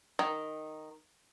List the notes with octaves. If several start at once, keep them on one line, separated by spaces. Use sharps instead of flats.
D#3